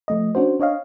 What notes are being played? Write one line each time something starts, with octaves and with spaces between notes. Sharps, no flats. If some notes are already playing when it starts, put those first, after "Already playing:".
F3 A3 D#5
C#4 D4 F#4 C5
D4 C#5 D#5 F5